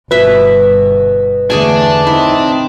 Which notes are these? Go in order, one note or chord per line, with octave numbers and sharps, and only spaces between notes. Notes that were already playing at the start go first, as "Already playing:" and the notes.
G1 B2 B4 E5
E2 D3 A3 D4 G#4 G#5
C4 D#4 E4